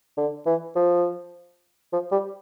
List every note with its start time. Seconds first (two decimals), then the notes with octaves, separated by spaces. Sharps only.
0.17 D3
0.46 E3
0.75 F3
1.92 F3
2.12 G3